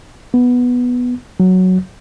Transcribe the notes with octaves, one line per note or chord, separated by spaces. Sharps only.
B3
F#3